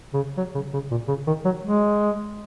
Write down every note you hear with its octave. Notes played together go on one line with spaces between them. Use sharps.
C#3
F#3
C#3
C#3
A#2
C#3
D#3
F#3
G#3